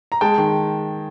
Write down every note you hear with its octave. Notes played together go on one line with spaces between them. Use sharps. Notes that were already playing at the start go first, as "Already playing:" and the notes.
A#5
G#3 G5 A5
D#3